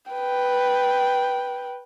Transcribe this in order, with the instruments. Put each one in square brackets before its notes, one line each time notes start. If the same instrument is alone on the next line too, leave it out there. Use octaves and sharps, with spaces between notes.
[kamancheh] B4 G5